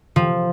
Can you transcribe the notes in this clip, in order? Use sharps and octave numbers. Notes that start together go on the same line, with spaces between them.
F3